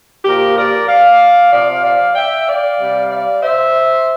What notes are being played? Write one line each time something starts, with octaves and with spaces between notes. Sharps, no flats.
A#2 F3 G4 A#4
A#4 D5
D5 F5
C3 F3 D5 F5
D5 F5
E5 G5
D5 F5
C3 G3
D5 F5
C5 E5